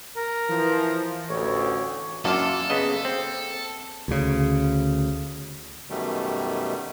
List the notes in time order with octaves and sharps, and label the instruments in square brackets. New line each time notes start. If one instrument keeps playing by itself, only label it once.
[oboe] A#4
[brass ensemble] E3 F3
[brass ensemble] A1 D2 [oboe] C#5
[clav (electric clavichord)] F#2 [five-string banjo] A#3 D4 F4 [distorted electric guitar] A4
[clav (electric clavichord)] C#3 B3 D#5
C4
[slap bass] D2 C#3
[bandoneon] F#2 B2 D#3 G3 A3